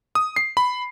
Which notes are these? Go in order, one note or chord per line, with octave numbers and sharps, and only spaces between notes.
D#6
C7
B5